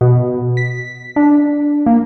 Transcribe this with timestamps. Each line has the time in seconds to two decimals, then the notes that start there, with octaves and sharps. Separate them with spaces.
0.01 B2
0.57 B6
1.16 D4
1.86 A#3